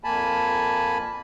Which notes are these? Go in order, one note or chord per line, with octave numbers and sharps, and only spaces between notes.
F2 A#3 G#5 A5 B5